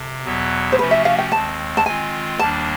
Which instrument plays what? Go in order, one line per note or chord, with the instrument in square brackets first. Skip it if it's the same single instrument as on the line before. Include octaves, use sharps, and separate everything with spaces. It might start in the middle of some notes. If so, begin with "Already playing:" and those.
Already playing: [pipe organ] C3 [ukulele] A4
[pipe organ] E2 B2 F#3 B3
[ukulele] C5
[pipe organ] C3 F3 A3 C#4 F#4 [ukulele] B4
[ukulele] E5
F5
G5
[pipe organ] D#2 D#3 G#3 C4 [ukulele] A5
[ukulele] A5
[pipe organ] D#3 G#3 C4 F4 [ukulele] G#5
[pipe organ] D#2 D#3 G3 A#3 D4 [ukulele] A5